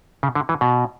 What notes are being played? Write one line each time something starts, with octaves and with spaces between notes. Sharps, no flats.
C#3
D3
E3
B2